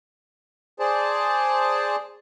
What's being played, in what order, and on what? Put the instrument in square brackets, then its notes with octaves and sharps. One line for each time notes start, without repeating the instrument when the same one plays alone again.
[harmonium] G#4 C5 D5 A5